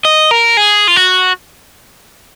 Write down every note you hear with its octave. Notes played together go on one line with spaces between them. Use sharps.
D#5
A#4
G#4
F4
F#4